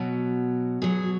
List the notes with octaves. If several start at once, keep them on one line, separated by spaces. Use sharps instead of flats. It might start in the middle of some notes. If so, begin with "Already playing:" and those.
Already playing: B2 F#3
B2 F#3 G#4